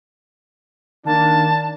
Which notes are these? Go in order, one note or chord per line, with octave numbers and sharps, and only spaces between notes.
D#3 A#3 D4 A5